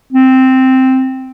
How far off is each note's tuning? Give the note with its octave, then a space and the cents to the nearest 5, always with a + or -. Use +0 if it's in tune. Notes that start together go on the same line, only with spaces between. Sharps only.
C4 -5